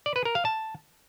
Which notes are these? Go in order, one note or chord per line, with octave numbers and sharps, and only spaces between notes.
D5
B4
A#4
F5
A5